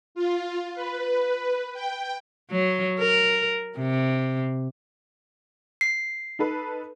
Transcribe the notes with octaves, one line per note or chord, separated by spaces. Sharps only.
F4
B4
G5
F#3
A#4
C3
C7
D#4 A4 B4